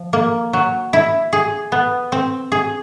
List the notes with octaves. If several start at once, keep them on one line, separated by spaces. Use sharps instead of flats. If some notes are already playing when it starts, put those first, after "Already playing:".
Already playing: F3
A#3
F#3
E4
G#4
B3
C4
G#4